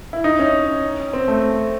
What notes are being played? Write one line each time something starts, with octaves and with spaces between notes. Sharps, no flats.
E4
D#4
C#4
C4
A3